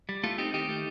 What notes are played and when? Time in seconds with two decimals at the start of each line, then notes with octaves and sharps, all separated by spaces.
0.09 G3
0.23 A3 F4 A4
0.38 C4 D#4 G4
0.54 D#3 D#4 G4
0.69 A3